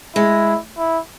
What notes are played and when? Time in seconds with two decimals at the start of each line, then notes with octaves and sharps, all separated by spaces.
0.16 G#3 E4
0.78 E4